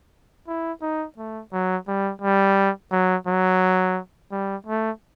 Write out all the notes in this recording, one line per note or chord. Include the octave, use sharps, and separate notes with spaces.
E4
D#4
A3
F#3
G3
G3
F#3
F#3
G3
A3